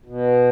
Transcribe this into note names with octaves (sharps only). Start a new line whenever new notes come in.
B2